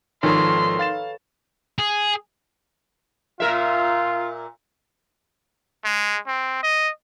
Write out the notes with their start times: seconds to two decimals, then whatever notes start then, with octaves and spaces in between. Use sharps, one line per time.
0.23 G#1 D#3 F3 A4 B4 C#5 C6
0.79 F5 A6 E7
1.79 G#4
3.40 A#2 F4 A#4 E5
5.85 G#3
6.27 C4
6.63 D#5